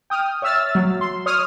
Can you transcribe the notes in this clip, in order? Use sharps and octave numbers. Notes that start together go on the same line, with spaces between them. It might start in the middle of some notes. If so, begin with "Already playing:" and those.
G5 D#6 F6
C#5 E5 E6 F6 A6
F#3
C6
C#5 D#6 F6